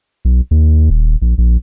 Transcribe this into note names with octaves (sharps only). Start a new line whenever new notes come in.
B1
D#2
D#1
A#1
A#1